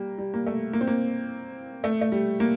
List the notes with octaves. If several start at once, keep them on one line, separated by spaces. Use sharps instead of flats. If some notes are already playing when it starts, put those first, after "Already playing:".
Already playing: G3 A#3
G3
A#3
A3
A#3
C4
A#3
A3
A3
G3
A#3